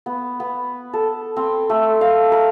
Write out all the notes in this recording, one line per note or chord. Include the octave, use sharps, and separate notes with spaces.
B3
B3
A4
C4
A3
F5
A#4